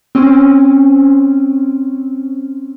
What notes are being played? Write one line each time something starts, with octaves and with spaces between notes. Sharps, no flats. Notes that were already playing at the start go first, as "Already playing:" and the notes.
C4 C#4